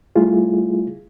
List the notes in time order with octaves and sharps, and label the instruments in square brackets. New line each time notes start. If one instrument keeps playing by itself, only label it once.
[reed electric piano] G3 A3 E4 F4 G#4